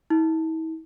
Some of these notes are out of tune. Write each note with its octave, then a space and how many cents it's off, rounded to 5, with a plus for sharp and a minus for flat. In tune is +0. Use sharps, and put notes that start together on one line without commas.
E4 -45